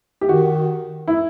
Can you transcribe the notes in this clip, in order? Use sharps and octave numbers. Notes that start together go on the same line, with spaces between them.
G4
D#3 F#4
E4